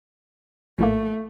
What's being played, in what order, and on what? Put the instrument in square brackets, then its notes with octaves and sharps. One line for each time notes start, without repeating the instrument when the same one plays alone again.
[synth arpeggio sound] A#1 A2 A#3 [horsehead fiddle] A3